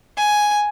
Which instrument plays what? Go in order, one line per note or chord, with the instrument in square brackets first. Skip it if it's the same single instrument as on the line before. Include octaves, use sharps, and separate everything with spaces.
[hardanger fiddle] G#5